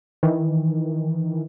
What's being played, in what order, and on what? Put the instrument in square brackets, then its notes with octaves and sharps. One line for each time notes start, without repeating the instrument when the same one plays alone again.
[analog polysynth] D#3 E3